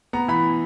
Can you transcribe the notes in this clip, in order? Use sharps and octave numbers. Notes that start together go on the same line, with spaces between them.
B3 A#5
E3 B5